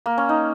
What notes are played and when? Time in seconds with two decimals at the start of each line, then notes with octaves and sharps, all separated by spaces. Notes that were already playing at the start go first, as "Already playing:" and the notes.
0.06 A#3
0.18 C#4
0.29 D#4